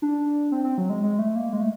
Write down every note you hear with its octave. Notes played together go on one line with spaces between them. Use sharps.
D4
C4
C4
F#3
G#3
G#3
A3
A#3
G#3
A3